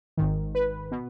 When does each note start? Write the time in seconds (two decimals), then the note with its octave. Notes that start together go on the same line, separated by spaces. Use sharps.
0.17 G#1 G#2 D#3
0.55 B4
0.91 B2